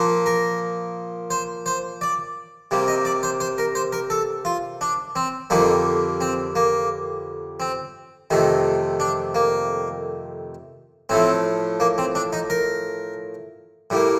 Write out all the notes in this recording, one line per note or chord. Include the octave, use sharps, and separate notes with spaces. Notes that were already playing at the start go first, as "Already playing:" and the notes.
Already playing: A#2 F3 A#3
A#4
C5
C5
D5
C3 G3 A#3
D#5
D5
C5
C5
A#4
C5
A#4
A4
F4
D4
C4
F2 D3 G3 A#3 D#4
C4
A#3
C4
F2 C3 D#3 A3 D#4
D4
A#3
A2 F3 A3 C4
A#3
C4
D4
D#4
A#4
A2 G3 A#3